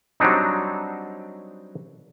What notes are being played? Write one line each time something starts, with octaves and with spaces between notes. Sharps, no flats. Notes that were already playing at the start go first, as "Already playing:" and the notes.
F#3 G3 C4 D4 D#4